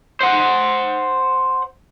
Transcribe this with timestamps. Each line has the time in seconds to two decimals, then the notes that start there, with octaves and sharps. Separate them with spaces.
0.21 C5 F#5